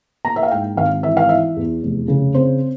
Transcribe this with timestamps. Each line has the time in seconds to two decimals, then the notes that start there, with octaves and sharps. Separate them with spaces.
0.24 A#3 A#5
0.36 E5
0.43 F5
0.51 G#2 G5
0.77 G#1 F5
1.03 E3 E5
1.17 F5
1.29 E3 E5
1.56 E2
1.82 F1
2.08 C#3
2.34 C4 C5